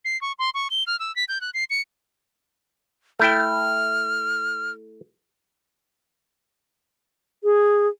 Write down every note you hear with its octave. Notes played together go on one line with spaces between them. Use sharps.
C7
C#6
C6
C#6
G7
F6
E6
B6
G6
F#6
C7
C#7
A3 E4 G5 F6
G#4